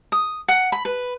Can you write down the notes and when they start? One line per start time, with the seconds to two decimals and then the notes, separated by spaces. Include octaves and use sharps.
0.12 D#6
0.48 F#5
0.72 B5
0.85 B4